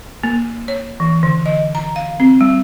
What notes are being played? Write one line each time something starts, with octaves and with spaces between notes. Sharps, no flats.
A#3
C#5
E3
D3
D#5
A#5
F5
C4
G3